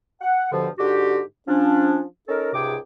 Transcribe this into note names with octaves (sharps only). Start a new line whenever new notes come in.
F#5
G2 B2 D3 F3
G#2 D3 F#4 G4
F3 C#4 D4
C#4 D#4 A4 A#4
C#2 G#2 C3 G#4 G5 D6